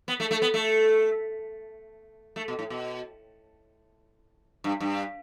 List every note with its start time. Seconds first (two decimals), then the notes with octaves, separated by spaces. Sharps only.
0.08 B3
0.20 A3
0.31 A3
0.42 B3
0.54 A3
2.36 A3
2.48 B2
2.59 A2
2.70 B2
4.64 G2
4.80 G2